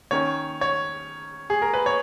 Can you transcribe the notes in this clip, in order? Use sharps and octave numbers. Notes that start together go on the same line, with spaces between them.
D#3 A#3 C#4 C#5
C#5
G#4
A#4
B4
C#5